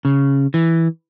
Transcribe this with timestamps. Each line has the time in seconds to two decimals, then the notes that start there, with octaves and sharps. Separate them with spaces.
0.05 C#3
0.54 E3